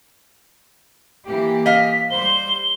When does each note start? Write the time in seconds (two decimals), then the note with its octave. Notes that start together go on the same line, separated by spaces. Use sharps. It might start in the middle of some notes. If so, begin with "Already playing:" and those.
1.27 E3 A#3 G4
1.66 D#5 F5 B6
2.11 G3 C5 G7